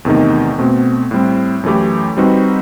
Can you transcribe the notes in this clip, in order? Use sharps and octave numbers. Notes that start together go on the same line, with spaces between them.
E2 C3 D#3 A3 D#4
B2 A3 C4
A2 G3 C4
F#2 E3 A3 E4 G4
G3 C4 D#4 F#4 B4